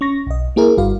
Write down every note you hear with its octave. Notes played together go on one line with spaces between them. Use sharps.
C#4 C#6 A#6
B1 D#5
A#3 E4 G#4 A#4
G1 G2 F#4 F5